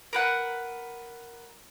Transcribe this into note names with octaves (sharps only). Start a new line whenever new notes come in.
A#4 B4 F#5